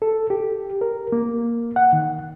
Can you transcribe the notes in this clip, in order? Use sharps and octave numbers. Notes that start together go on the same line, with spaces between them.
A4
G4
A#4
A#3
F#5
D#3